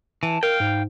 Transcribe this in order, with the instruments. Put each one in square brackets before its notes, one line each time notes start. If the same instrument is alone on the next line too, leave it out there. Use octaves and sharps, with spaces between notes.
[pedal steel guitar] E3 [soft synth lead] A5
[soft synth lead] A#4 [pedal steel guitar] F5 G5
[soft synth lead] G#2